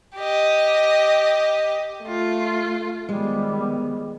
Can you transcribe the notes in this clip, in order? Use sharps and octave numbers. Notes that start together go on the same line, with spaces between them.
G4 D#5
A3 F4
D#3 F3 G3 G#3 B3